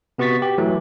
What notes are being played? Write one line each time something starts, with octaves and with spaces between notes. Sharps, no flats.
C3 B3 F#4 C#6 A6 B6
G4
E3 F#3 A3